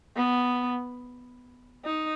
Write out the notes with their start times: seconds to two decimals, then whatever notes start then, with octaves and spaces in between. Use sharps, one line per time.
0.16 B3
1.85 D#4